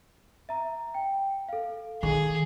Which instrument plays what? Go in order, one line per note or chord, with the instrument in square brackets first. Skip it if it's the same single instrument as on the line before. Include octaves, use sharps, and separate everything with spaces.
[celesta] E5 A#5
G5
A4 F5
[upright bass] D#3 [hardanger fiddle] G#4